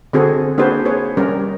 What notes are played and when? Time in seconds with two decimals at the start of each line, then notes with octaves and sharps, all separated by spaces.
0.13 D3 C4 F#4 G#4 A4
0.58 A#3 D4 F#4 G#4 B4 C5
0.85 G#4 B4 C#5
1.17 G3 C#4 A#4